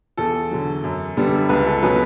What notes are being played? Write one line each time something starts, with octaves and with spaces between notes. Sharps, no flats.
E2 A4
D3 F#3
F#2
D3 G3 B3 D4
C#2 B4
A4
B2 F#3 B4